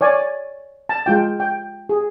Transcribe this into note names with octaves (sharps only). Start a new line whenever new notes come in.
C#5 D5 G#5
A5
G#3 F4 G5
G5
G#4